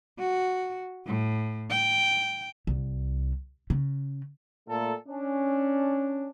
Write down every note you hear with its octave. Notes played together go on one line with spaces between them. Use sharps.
F#4
A2
G5
C2
C#3
A#2 A3 A4
C#4 D4